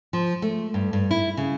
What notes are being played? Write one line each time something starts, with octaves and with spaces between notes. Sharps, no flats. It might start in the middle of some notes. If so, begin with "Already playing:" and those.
F3
A3
G2
G2
E4
C#3